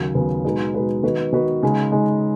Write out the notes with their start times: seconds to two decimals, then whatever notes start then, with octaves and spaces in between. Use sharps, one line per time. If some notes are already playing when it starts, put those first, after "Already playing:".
Already playing: D#2 C#3 F#3
0.15 D#2 C#3 F#3 B3
0.44 B2 G#3 D#4 B4
0.74 B2 G#3 D#4 B4
1.03 D#3 B3 F#4 B4
1.33 D#3 B3 F#4 B4
1.63 C#3 G#3 D#4
1.92 C#3 G#3 D#4